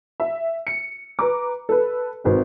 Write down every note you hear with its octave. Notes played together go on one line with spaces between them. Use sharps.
E5
C#7
B4 A#5 D6
A4 B4
G#1 C4 B4